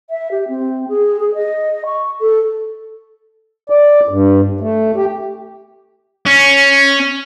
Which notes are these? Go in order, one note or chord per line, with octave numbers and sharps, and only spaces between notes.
E5
G4
C4
G#4
G#4
D#5
C#6
A4
D5
G2
A3
G4
C#4